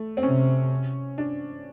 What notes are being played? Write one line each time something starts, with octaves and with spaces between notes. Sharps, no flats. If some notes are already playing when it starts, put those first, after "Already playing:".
Already playing: A3
C4
C3 C#4
D4